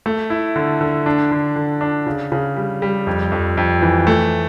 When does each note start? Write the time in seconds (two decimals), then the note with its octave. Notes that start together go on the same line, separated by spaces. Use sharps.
0.06 A3
0.30 E4
0.56 D3
0.81 D3
1.06 D4
1.31 D3
1.56 D3
1.81 D4
2.07 C#3
2.32 C#3
2.56 G3
2.82 G3
3.07 F2
3.32 F2
3.57 F2
3.82 E3
4.07 A3